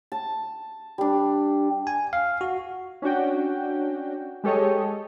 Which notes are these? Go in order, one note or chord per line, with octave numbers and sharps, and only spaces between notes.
A5
G3 D4
G#5
F5
F#4
C#4 D4 F#4 G5
G#3 G4 A4 C#5 D#5